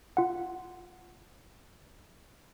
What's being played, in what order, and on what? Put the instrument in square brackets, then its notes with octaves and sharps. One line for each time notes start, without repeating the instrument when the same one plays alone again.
[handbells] F4 F#5